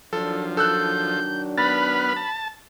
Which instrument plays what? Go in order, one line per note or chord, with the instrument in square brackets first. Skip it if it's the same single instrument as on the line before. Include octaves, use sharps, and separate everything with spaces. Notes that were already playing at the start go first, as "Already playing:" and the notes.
[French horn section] D#3 F#3 D4 [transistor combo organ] F3 [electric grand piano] A4
[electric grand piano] A4 E6 F#6 [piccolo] G6
[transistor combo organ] B3 B4 F6 [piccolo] B5 [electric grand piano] A6
[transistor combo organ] A5